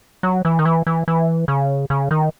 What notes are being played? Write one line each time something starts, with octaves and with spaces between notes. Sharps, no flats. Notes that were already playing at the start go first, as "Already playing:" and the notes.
F#3
E3
D#3
E3
E3
E3
C#3
C#3
D#3